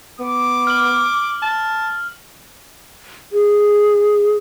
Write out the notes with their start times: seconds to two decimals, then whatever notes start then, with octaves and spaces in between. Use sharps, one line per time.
0.20 B3 D6
0.67 F6 F#7
1.43 A5
3.32 G#4